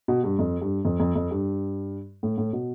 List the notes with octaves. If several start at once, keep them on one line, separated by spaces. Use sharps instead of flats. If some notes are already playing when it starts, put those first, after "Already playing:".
B2
G2
F2
G2
F2
F2
F2
G2
A2
A2
B2